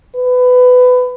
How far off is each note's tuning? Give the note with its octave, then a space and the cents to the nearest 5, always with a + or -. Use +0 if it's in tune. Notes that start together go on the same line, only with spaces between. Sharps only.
B4 +20